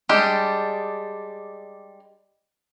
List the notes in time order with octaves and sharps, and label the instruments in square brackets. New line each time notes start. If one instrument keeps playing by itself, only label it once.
[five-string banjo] G3 G#3 D4 G4